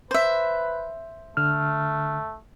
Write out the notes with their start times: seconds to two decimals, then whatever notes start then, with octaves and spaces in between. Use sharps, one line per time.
0.11 B4 C5 E5
1.37 D3 A3 F6